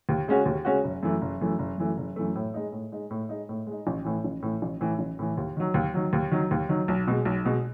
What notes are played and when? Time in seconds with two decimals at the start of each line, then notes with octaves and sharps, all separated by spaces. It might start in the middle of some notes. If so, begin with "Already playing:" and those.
0.09 D#2
0.28 C#3 G#3 C#4 F#4
0.46 D#2
0.65 C#3 G#3 C#4 F#4
0.84 F#1
1.03 F#2 E3 A3
1.22 F#1
1.41 F#2 E3 A3
1.59 F#1
1.78 F#2 E3 A3
1.97 F#1
2.16 F#2 E3 A3
2.35 A2
2.54 G#3 D#4
2.72 A2
2.92 G#3 D#4
3.11 A2
3.29 G#3 D#4
3.49 A2
3.67 G#3 D#4
3.87 A1
4.05 A2 E3
4.24 A1
4.42 A2 E3
4.62 A1
4.81 A2 E3
4.99 A1
5.19 A2 E3
5.37 D#2
5.57 D#3 F#3
5.74 D#2
5.94 D#3 F#3
6.13 D#2
6.31 D#3 F#3
6.51 D#2
6.69 D#3 F#3
6.88 B1
7.07 B2 G#3
7.25 B1
7.45 B2 G#3